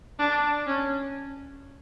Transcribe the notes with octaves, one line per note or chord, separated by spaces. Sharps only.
D4
C#4